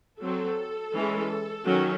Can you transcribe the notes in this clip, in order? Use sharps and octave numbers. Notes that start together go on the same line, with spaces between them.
F#3 C4 A4
E3 G#3 C#4
D#3 F#3 C#4